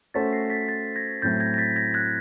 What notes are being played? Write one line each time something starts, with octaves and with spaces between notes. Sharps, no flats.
A3 C#4 F#4 A4 C5 A6 B6
A#6 C7
A6 B6
A6 B6
G#6 A#6
A2 F#3 A3 C4 G6 A6
G#6 A#6
A#6
A6 B6
G#6 A#6
F#6 G#6